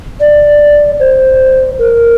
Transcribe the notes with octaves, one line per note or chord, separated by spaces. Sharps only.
D5
C5
A#4